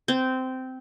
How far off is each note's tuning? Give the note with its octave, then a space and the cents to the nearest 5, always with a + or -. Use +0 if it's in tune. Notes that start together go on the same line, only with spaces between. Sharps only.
C4 -15